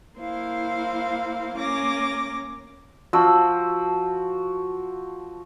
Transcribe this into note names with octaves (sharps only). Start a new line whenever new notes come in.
A#3 E4 C5 F5
A#3 C#4 D6 A#6
F3 F#4 E6